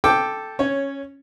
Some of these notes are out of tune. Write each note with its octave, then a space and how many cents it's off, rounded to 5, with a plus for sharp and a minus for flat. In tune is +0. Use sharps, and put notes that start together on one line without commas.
A4 -5 G5 +0 D6 +0
C#4 -10 C#5 +0